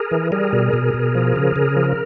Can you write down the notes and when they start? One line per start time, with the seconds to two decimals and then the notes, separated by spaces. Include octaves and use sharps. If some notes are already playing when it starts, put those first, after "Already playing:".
Already playing: G#4 A#4
0.11 E3
0.32 G3 G#4 A#4
0.53 B2
0.73 B2
0.94 B2
1.15 F3
1.36 C#3
1.56 C#3
1.76 F3